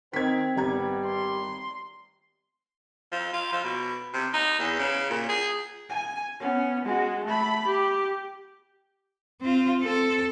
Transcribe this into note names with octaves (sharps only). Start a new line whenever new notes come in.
D#3 C4 G#6 B6
G#1 G3 B3 A#5 G#6
C6
F3
F4
F3
B2
C3
D#4
E2
C#3
A#2
G#4
G#5
B3 C#4
G#3 F#4
A3 B5
G4
C4 F4
C4 A4